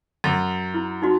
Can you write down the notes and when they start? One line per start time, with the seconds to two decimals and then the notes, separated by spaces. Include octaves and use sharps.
0.24 F#2
0.74 E4
1.02 D#4 F#4